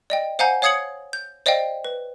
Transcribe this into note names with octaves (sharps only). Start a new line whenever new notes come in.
D5 D#5 G5
C5 F5 F#5 G#5 A#5 G6
C#5 F5 D#6 G#6 C#7 F#7
G6
C5 D5 D#5 F5 G5
B4